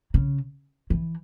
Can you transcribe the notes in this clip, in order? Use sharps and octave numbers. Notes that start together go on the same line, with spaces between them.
C#3
E3